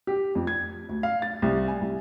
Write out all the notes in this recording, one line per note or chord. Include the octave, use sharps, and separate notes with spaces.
G4
F2
G#6
D2
F5
A6
C2
G#5
C2